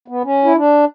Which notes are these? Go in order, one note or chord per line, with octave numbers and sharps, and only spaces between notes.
B3
C#4
E4
D4